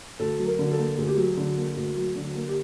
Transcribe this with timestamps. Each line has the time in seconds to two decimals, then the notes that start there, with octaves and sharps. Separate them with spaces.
0.19 D2 A4
0.39 F#3
0.46 A#4
0.59 D3
0.72 A4
0.78 A#3
0.98 D2 G#4
1.08 G4
1.17 F#3 G#4
1.37 D3
1.57 A#3
1.77 D2
1.96 F#3
2.16 D3
2.35 A#3
2.48 G4